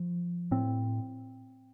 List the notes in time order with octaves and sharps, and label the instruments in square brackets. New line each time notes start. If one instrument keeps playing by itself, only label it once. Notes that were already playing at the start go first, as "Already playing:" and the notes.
Already playing: [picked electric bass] F3
A2 C4